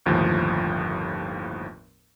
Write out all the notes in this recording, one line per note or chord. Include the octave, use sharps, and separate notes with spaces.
G1 D#2 A2 F3